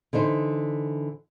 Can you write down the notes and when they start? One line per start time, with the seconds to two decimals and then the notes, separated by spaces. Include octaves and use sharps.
0.13 D3 E3 D#4 C5